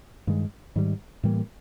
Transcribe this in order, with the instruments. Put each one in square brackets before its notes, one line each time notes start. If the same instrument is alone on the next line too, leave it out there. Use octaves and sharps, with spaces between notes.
[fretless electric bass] G2 D#3 G#3
G#2 D#3 G3
A2 E3 G3 A#3